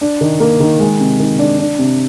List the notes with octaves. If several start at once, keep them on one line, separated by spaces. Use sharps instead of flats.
D4
D#3
A#3
D#3
G#3
C3
D#3
D4
D4
C3